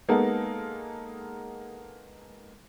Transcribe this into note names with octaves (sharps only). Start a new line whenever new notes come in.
G#3 A#3 B3 D#4 A4